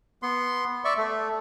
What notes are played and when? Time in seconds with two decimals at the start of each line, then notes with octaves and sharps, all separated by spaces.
0.22 B3 C6
0.85 D5 E5 C#6
0.98 A3